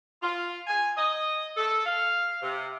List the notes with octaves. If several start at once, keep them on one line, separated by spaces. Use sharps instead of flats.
F4
G#5
D#5
A4
F5
C3